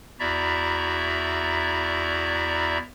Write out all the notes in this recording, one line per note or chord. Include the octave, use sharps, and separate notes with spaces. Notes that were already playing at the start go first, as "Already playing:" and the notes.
E2 E4 F#4 D5 E5 A#5